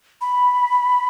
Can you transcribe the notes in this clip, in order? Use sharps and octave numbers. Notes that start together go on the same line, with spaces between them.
B5